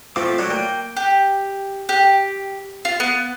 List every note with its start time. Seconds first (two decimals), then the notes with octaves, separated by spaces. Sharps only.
0.16 F3 A3 C4 F4 F5 D6
0.38 A2 F#3 D4
0.50 A#3 G5
0.96 G4
1.89 G4
2.85 F4
3.00 B3